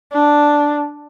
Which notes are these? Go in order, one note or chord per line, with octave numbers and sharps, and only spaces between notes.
D4